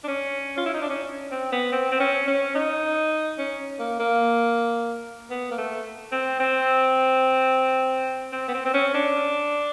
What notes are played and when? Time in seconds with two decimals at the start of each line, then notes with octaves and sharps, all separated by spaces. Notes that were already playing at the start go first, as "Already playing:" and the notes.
0.04 D4
0.08 C#4
0.57 F4
0.66 E4
0.74 D#4
0.82 D4
0.90 C#4
1.31 C4
1.52 B3
1.72 C4
1.91 C4
2.00 C#4
2.27 C#4
2.55 D#4
3.38 C#4
3.79 A#3
3.99 A#3
5.30 B3
5.51 A#3
5.58 A3
6.12 C4
6.40 C4
8.32 C4
8.48 B3
8.54 C4
8.65 C4
8.74 C#4
8.94 D4